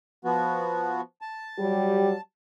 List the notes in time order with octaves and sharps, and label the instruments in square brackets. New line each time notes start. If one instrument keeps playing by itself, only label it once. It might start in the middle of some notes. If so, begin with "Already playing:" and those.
[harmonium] F3 B3 F#4
A5
[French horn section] F#3 G3 G4